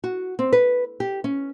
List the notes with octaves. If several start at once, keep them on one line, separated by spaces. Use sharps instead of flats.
F#4
C4
B4
G4
C#4